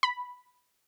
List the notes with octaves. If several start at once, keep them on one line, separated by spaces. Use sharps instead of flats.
B5